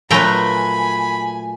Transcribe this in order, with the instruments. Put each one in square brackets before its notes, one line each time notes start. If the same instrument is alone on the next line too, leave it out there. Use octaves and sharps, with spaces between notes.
[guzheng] A#2 F#3 B4 [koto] A3 G5 A#5 [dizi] G#5 [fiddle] B5